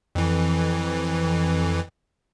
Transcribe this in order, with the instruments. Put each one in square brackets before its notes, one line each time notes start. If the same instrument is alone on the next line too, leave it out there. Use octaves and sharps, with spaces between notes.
[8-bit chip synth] F2 E3